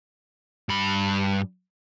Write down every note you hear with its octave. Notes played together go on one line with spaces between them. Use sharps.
G2 B5